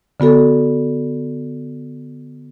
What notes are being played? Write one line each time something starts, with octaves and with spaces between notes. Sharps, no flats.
D3 B3 F#4 A4